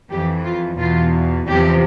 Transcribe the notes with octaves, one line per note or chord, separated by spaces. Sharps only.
F2 E3 G4
F4
E2 B2 F4
E2 C3 F3 G4